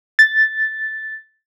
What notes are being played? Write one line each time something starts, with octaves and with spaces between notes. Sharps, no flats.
A6